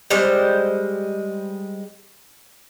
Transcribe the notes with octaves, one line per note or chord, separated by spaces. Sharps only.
G3 G#3 C5